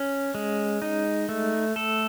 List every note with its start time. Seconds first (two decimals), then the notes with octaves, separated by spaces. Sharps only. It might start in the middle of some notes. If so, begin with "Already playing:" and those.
Already playing: C#4
0.35 G#3
0.82 D#4
1.29 A3
1.76 A4